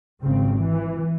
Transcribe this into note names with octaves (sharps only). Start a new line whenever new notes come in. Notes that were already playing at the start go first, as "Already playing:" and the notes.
G#1 C#3 C4
E3